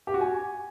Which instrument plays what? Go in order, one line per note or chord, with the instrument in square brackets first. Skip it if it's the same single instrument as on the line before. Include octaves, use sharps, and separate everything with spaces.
[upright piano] G4
F#4
G#5